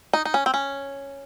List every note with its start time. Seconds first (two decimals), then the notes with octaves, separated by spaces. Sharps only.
0.13 D#4
0.25 D#4
0.34 C#4
0.46 C4
0.54 C#4